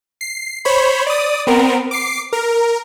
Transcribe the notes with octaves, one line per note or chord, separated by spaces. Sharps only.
C7
C5 C#5 B5
D5 D#6
B3 C4 A#4
D6 C7
A#4